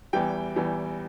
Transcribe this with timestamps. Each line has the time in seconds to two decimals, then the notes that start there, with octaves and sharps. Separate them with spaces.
0.13 E2 E3 G3 G5
0.56 E2 E3 G3